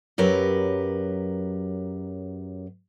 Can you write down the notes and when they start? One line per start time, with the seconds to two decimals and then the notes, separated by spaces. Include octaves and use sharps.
0.18 F#2 F#3 G4 A#4 B4